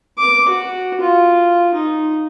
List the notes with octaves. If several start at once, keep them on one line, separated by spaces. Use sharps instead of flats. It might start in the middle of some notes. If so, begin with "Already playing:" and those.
D6
F#4
F4
D#4